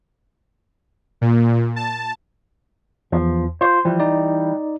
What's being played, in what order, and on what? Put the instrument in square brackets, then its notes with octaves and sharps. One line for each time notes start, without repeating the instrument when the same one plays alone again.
[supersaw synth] A#2
A5
[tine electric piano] E2 [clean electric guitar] F3
[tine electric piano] F4 [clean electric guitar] C5
[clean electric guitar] E3 G3 [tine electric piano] F3
[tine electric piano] D#4 D5